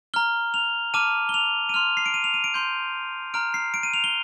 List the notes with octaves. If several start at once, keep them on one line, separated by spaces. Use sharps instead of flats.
A#5 F6 G7
F7
A5 D6 F6 D#7
G7
F7
D#7
C6 F6 F7
C7
D7
D#7
F7
D#7
D7
C6 G6
A#5 F6 D7
C7
D7
D#7
F7
G7